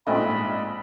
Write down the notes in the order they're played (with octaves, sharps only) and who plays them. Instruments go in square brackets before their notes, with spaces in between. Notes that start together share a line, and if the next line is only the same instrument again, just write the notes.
[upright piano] A#1 G#2 D#5 [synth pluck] A3 C4 F4 [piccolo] B5